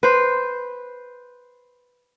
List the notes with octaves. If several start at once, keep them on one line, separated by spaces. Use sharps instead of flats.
B4 C5